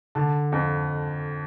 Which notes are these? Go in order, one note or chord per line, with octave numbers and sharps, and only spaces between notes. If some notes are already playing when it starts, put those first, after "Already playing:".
D3 A5
F2